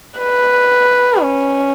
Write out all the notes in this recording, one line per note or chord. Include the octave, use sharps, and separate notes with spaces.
B4
C#4